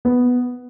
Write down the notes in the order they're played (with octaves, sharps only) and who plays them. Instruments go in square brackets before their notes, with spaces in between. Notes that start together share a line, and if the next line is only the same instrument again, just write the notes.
[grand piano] B3